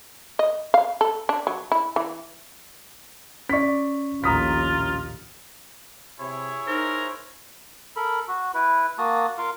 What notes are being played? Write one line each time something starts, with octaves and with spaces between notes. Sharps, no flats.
D#5
F5
A4
D4
F#3
E4
E3
C#4 D5 C#6 B6
A#1 D#2 A2 F4 A#5 D#6 B6
C3 E4 G#4 C#5
D#4 A#4 C5
A4 A#4 B5
F#4
E4 B4
A#3 F#4 A5 D#6
F4 A#4 F5